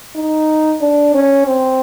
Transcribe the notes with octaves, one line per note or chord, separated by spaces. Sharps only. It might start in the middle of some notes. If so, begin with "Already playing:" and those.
D#4
D4
C#4
C4